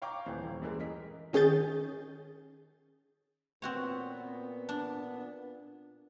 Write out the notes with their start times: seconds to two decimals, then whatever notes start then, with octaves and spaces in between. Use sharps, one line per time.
0.02 C#5 F5 G5 A#5 C#6 D6
0.26 D#1 E3 C5
0.44 D#1
0.62 F#2 E3 G#3 A#3
0.79 A#4 D#5 B6
1.33 D#3 C#4 G#4 G6 A6
3.62 A#2 B3 C4 F#4 C#5
4.69 D4